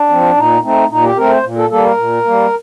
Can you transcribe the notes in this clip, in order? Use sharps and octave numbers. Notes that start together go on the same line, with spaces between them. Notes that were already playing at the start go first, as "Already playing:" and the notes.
Already playing: D4
F3 C4
A#2 D#4
A3 C4 D#4
A#2 D#4
G4
A3 C4 A#4
C5
A#2
A4
G3 A#3 A4
A#4
A#2
G3 A#3